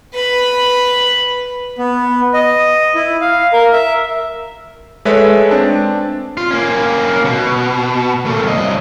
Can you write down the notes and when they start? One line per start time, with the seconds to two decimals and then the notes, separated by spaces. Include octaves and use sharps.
0.13 B4 B5
1.78 B3
2.34 D#5
2.95 E4
3.21 F5
3.53 A#4
3.73 E5
5.05 G#3 A3 A4 B4 C#5 E5
5.51 C4 D4 A5
6.37 F4
6.51 A#3 C#4
7.25 B2
8.26 A3 A#3
8.43 C2 D#5